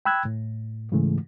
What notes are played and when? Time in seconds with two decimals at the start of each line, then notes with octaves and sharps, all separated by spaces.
0.05 G5 B5 E6 F#6 G#6
0.25 A2
0.92 G#2 C#3 E3 G#3 A3